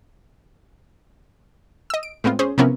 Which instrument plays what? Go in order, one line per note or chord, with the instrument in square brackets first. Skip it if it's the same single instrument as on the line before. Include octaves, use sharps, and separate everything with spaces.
[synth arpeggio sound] D#5 E6
D7
A2 G#3 B3 C4 F4
C#4 G#4 C5
C3 F3 B3 C#4 E4 A#4